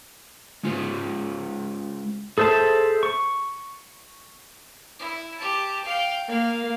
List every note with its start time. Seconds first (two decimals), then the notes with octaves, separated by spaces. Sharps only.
0.63 G#3 C#4 F4 G#4 C5
2.38 G#4 A4 C5 E5 A5
3.03 C#6
4.99 E4
5.37 G4 A5
5.84 F5 G5
6.28 A#3 F5